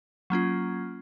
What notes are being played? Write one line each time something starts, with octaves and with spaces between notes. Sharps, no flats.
F#3 A#3 C#4 F4